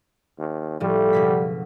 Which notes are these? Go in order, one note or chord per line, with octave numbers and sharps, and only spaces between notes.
D#2
A2 F3 G3
F#1 B2 B6